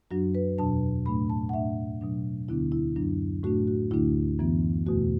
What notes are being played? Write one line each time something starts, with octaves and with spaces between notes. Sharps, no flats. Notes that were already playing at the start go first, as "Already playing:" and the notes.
F#2 F#3 D4 F#4
B4
E2 B2 F#3 D4 A5
A2 A3 D4 B5
A5
F#5
A2 A3 D4 E5
B2 F#3 D4
D2 D3 B3 D4 E4
E4
F#2 F#3 D4
A2 A3 D4 F#4
F#4
D2 D3 A3 D4 E4
F#2 E3 B3
E2 B2 A3 F#4